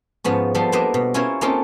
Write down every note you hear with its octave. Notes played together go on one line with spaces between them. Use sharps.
G#2 F3 B3 C#4
F3 G3 B3 A4 C5 C6
A#3 B3 D4 C5 D#5 E5
B2
C#4 E4 F4 A#4 C5 C#5
A#3 C4 C#4 D#4 F4 A4